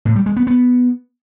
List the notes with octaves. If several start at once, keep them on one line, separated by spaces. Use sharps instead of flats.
A2
G3
G#3
B3
B3